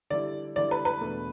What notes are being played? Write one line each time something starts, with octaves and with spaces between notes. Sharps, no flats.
D3 G3 E4 D5
D3 G3 E4 D5
B4
B4
E2 B2 A3 D4 A4